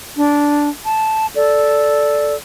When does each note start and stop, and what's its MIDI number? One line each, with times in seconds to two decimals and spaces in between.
0.16 0.69 62
0.84 1.26 81
1.35 2.34 69
1.35 2.34 74